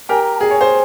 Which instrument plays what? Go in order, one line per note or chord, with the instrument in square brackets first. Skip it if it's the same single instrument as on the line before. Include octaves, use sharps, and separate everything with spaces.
[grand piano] G4 A#4 [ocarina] G#5
[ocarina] A#5
A#5
[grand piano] G#4 [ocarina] G#5
[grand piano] C#5
C5